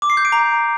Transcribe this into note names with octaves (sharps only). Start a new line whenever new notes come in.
D6
C7
G6
D7
A#5